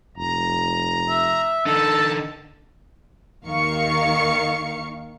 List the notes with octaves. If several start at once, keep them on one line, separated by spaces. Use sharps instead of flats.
F1 A#5
E5
D3 D#4 A4 A5
D#2 D#3 F5 C#6 C#7